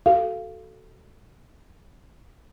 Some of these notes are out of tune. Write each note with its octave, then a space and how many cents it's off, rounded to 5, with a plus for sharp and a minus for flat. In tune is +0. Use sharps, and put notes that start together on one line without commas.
F#4 +20 A4 +0 F5 -15